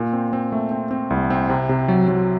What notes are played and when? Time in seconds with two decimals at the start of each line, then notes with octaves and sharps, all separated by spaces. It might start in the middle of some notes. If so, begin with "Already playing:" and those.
Already playing: A#2
0.13 C4
0.33 C4
0.52 A3
0.71 C4
0.91 C4
1.10 C2
1.30 C4
1.49 C3
1.69 C3
1.88 F#3
2.08 F#3